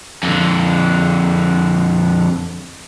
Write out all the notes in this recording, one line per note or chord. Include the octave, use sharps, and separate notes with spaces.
F2 D3